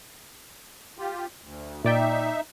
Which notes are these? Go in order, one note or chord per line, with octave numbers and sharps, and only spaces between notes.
F4 G4
D2
A#2 D#4 D5 E5 G5